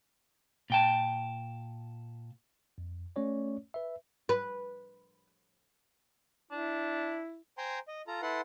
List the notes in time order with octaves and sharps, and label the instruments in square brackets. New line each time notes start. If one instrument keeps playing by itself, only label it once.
[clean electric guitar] A#2 G5 A5
[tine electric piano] F2
A3 C#4 C#5 D5
B4 E5
[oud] B4
[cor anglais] D4 [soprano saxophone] E4
[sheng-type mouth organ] C5 G5 G#5 A#5 C6
D#5
F4 A4 A#5
E4 A4 B4 F#5 C6